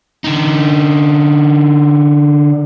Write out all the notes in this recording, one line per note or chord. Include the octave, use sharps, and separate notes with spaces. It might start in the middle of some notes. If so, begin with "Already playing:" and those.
D3 D#4